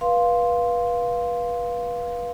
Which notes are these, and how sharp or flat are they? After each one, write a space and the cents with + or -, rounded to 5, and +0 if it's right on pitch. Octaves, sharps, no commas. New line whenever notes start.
B4 -25 F5 +0 C6 +0